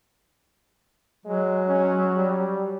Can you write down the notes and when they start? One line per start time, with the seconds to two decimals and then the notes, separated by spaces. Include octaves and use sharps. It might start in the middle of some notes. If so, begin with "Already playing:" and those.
1.26 F#3 G#3
1.68 C#4
2.16 G3